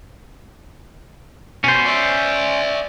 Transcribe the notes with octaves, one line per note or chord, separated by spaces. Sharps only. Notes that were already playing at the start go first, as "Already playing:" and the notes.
B2 C#4 C5
D5 E5